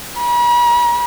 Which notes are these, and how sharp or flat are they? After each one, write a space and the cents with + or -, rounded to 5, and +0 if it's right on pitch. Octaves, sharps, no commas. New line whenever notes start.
B5 -45